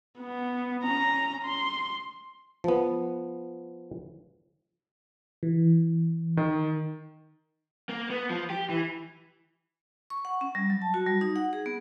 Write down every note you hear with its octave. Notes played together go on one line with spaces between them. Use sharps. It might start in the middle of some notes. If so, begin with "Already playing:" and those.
B3
C#4 A#5
C6
F3 B3
E3
D#3
A#3
B3
F3
G4
E3
C#6
F#5
C#4
G3
F#3
A5
F#4
G3
D#4
F#5
G#4
B3